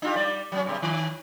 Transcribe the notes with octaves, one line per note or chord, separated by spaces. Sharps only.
D4 F4 G4
G3 D5
F#3 B3 C#4
G2 B2
D#3